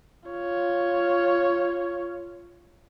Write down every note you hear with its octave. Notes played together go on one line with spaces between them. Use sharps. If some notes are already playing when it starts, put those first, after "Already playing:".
F4 C#5